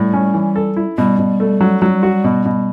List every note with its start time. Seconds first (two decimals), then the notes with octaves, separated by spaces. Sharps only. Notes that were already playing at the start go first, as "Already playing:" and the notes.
Already playing: A2 G3
0.13 C#4
0.34 E3
0.56 A4
0.76 E4
0.98 B2 G3
1.19 B2
1.40 A3
1.61 F#3
1.82 F#3
2.03 F#4
2.24 B2
2.46 B2